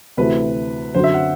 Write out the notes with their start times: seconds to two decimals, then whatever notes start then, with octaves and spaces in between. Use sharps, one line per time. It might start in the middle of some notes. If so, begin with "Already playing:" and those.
0.17 D2 C3 E3 A3 E4 B4
0.94 F#2 D3 F#3 C4 F#4 C5
1.04 E5
1.14 F#5